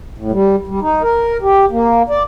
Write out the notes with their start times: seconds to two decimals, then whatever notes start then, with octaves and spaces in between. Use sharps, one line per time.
0.18 A2
0.32 G3
0.67 G3
0.81 D#4
1.03 A#4
1.42 G4
1.71 A#3
2.09 D5